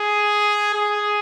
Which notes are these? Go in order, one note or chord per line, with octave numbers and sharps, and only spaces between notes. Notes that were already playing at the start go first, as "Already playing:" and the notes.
Already playing: G#4
G#4